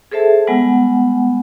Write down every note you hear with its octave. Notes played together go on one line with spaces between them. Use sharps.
G#4 A4 C5 E5 A5
G3 G#3 B3 F#5 G#5